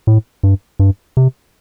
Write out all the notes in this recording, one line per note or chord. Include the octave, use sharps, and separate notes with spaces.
A2
G2
G2
C3